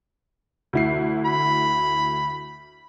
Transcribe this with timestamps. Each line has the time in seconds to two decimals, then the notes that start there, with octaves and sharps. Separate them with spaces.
0.73 D2 E4 C7
1.25 B5